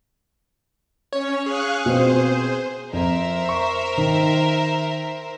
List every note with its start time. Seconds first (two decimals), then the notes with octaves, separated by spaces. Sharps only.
1.13 C#4 C#5
1.46 G#4 F5 C#6 F#6
1.86 B2 B3 C4 C5
2.93 F2 A#4 C5 E5
3.49 C#6
3.98 D#3